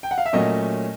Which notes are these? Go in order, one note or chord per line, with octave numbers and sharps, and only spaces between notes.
G5
F#5
F5
E5
A#2 F#3 A3 C#4 D#5